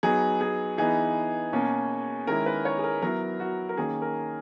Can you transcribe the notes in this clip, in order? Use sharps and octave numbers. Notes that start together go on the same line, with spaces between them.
F#3 B3 D#4 G#4
G#4
E3 B3 D#4 G#4
B2 A#3 C#4
D#3 G#3 C#4 E4 A#4
B4
C#5
G#4
A#4
F#3 B3 E4 A#4
F#4
A#4
D#3 A#3 C#4 G#4
A#4